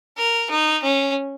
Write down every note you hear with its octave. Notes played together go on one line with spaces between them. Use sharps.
A#4
D#4
C#4